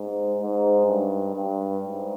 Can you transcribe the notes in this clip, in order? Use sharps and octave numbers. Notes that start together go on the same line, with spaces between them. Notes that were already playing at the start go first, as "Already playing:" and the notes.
Already playing: G#2
G#2
G2
G2
G#2